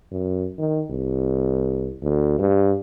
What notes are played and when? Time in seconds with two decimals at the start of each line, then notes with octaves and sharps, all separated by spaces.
0.12 F#2
0.59 D#3
0.91 C2
2.02 D2
2.39 G2